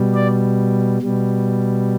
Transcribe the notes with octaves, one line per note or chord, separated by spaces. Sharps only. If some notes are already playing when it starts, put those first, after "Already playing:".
Already playing: B2 G3
D5
B2 G3